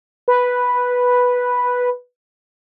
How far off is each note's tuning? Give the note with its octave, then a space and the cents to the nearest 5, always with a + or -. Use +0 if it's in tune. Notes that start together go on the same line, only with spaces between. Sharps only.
B4 -5